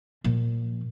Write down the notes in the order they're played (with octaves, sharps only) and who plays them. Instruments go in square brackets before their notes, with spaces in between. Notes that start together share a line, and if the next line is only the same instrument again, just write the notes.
[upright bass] A#2 F3